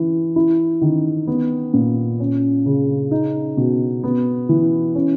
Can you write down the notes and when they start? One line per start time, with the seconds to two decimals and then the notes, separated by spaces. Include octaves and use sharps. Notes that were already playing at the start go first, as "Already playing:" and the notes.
Already playing: E3
0.36 E4
0.82 D#3
1.27 B3
1.74 A#2
2.20 C#4
2.66 C#3
3.11 D#4
3.57 B2
4.03 B3
4.49 E3
4.95 C#4